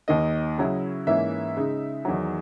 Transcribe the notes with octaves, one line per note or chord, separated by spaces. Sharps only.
D#2 D#3 A#3 D#5
C#3 F#3 C#4 E4
G#2 E3 A#3 C#4 E4 E5
C#3 G#3 D#4
E2 D#3 F#3